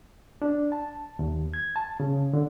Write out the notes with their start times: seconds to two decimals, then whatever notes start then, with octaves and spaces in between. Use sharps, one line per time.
0.42 D4
0.72 A5
1.19 D#2
1.54 G#6
1.76 A5
2.00 C#3
2.33 D3